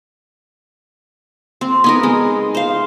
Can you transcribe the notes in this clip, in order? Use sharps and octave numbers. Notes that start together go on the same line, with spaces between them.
C4
B3 D#4 A#4
G#3
C5 F5